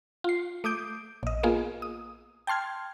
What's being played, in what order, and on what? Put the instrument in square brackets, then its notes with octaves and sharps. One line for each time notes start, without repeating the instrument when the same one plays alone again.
[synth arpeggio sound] F4 C7
A3 D6 D#6 G6 D7
A#1 D#5
A#3 B3 F4 G#4
D#6
G5 A5 C6 F6 G#6